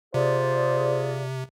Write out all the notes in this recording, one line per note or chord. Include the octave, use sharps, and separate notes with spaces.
C3 F4 G#4 C5 D5